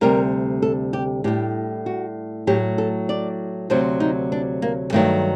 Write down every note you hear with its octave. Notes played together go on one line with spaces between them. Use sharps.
D2 C3 G3 A#4
A4
G4
A2 G3 G4
F#4
A2 F#3 G4
A4
D5
D2 C3 F#3 C5
D#4
D4
A#3
G2 D#3 F#3 A3